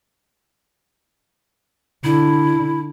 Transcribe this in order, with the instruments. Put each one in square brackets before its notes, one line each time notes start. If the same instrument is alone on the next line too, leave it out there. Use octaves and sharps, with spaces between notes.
[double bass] D3 [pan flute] E4